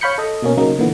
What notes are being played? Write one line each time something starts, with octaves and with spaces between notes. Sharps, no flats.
C#5 F5 B5 G6 C#7
A4 D#5
B2 A#3 C#4
C#3 F#3 A#3 D#4
A#2 D3 E3 B3